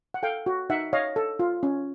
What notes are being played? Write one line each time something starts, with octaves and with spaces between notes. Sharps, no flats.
F#5
A4 F5 G5
F#4
D#4 E5 F#5
C#5 D#5 F5
A4
F4
C#4